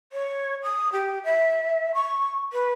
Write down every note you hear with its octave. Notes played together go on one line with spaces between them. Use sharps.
C#5
D#6
G4
E5
C#6
B4